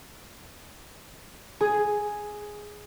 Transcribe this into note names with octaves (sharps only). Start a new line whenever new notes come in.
G#4